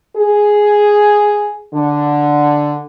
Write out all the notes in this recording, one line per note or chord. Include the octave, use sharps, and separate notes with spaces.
G#4
D3